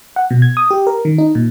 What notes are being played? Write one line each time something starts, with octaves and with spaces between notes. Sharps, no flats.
F#5
B2
G#6
D#6
G4
A#4
D#3
D#4
A#2